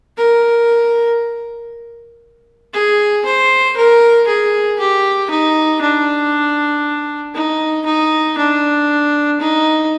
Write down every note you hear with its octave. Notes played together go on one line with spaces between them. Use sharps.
A#4
G#4
C5
A#4
G#4
G4
D#4
D4
D#4
D#4
D4
D#4